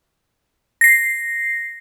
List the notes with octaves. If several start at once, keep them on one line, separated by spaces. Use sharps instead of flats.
A#6 C7